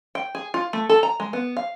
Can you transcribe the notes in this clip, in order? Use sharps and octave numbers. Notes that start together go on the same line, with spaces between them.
G5
G#4
F4
A3
A4
A#5
G#3
B3
F5